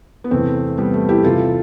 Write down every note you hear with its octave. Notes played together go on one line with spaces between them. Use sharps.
B3
E2 C3 E3 A3 C4
G3 B3
A3
E4 G4
E2 C3 E3 F4 A4